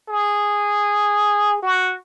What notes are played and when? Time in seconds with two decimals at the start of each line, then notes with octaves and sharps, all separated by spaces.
0.09 G#4
1.63 F#4